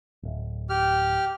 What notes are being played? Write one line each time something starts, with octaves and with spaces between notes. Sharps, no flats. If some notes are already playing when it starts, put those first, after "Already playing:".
D1
G4 F6